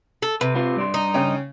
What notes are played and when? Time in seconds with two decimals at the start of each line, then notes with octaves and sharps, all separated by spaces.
0.22 A4
0.41 C3 B4
0.55 C4 F4 B4
0.76 G2 D5 C6
0.94 D#4
1.14 C#3 C#4 G5